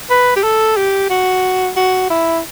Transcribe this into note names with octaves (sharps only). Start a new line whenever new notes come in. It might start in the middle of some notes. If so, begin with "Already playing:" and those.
B4
G4
A4
G4
F#4
F#4
E4